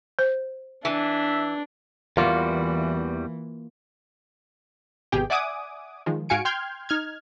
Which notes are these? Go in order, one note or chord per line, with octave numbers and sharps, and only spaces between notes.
C5
E3 D4 E5
E2 E3 G3 A#3 F4 F#4
G#1 B2 G4 G#4 G5
D5 E5 F#5 G#5 D6 D#6
D#3 F3 G#3
G#2 F#4 F5 G#5 C#7 D7
G5 C6 F6 G6 G#6
D#4 F6 G#6